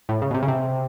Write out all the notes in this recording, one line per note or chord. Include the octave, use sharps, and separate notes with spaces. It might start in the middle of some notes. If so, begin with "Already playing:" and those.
A2
C#3
B2
C3
C#3
C3